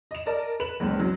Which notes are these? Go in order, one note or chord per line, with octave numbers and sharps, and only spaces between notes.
D#5 E7
A#4 D5 D#5 A5 A#5
B4 E7 F#7
F#1 C#2
F#3